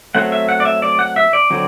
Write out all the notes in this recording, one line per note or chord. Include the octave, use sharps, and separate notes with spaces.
F#3 A3 C4 F#5
E5
F#5
D5
E5
D5
F#5
E5
D5
D3 F#3 C4